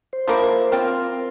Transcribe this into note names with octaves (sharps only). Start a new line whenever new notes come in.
C5
F3 A#3 E4
F3 C4 F4 A#4